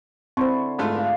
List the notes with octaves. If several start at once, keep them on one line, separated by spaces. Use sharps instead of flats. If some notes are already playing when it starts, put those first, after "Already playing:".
D3 C4 E4 C5 C6 C#6
G#2 A3 F4
D5 F5